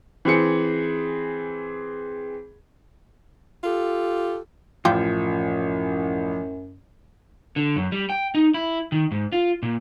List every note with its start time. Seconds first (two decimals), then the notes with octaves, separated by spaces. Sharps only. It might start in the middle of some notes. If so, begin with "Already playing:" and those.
0.25 E3 C4 G#4 C#7
3.64 F4 G4 A4
4.85 A1 F#2 F3 E4 F4 G4
7.56 D3
7.76 F#2
7.92 G3
8.10 G5
8.35 D#4
8.54 E4
8.92 D#3
9.11 G#2
9.32 F4
9.63 A#2